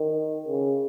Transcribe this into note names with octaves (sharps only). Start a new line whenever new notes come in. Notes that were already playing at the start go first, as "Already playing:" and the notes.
Already playing: D#3
C#3